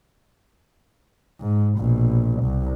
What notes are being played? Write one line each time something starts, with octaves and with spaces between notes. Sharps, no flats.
G#2
A#1 B2
C2